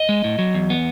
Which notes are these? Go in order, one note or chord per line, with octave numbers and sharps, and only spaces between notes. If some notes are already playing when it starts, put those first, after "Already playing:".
Already playing: D#5
G#3
A2
F#3
E2
B3